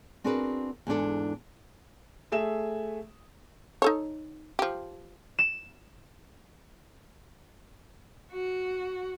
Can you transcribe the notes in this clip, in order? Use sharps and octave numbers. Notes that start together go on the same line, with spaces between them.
C4 D4 F#4 G#4 A#4 B4
E2 G#2 D4 A4
A3 G#4 E5 E7
D#4 A4 C#5
F3 G4
E7
F#4